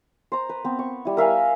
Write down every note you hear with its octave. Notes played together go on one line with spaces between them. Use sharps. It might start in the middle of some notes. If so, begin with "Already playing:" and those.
C5 A#5
B4
B3 C4
C#6
G3 E4
A#4 E5 F5 G#5